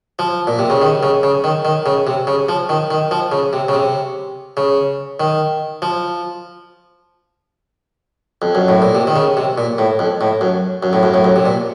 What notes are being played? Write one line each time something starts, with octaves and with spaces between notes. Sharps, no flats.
F3
A#2
C3
C#3
D#3
C#3
C#3
D#3
D#3
C#3
C3
C#3
F3
D#3
D#3
F3
C#3
C3
C#3
C3
C#3
D#3
F3
F2
F#2
A2
A#2
C3
D#3
C#3
C3
A#2
A2
F2
A2
F#2
F#2
A2
F#2
A2
F#2
C3
A#2